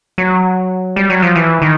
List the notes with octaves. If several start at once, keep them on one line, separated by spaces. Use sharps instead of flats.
F#3
G3
F#3
F3
E3
D#3